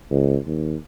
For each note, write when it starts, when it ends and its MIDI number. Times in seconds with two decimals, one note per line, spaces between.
0.11 0.37 37
0.47 0.76 39